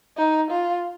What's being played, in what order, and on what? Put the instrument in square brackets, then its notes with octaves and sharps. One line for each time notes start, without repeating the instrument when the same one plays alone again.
[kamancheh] D#4
F4